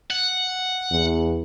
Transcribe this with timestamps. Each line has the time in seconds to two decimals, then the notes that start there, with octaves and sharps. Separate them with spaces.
0.11 F#5
0.91 E2